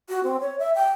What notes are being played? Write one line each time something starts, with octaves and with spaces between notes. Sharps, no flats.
F#4
C4
C#5
E5
G5